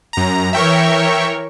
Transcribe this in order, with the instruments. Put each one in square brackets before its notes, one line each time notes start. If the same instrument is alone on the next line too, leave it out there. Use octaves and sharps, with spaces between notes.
[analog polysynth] F#2 A#5
[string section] E3 A#4 C#5 [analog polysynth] E5 G5 C#6